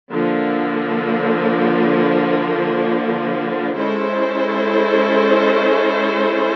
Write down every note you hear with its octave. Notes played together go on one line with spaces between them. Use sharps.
D3 F3 A#3
G#3 C#4 E4 A4 C5